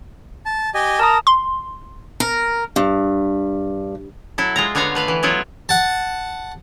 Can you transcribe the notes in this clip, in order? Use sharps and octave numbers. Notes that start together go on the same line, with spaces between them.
A5
G4 D#5 G#5
A#4 A5 A#5 D#6
C6
A#4
G2
F#3 E4 A4
G#3 F4 A#5
D3 B3 C#5 F5 A#5
A3 B4 F5
E3
F#3 B3 E4 F4 C#5
F#5 A5